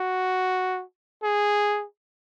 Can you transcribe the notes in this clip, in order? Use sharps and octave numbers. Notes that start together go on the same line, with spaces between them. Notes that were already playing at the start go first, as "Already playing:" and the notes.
Already playing: F#4
G#4